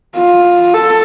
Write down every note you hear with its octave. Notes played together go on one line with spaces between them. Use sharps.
F4
A4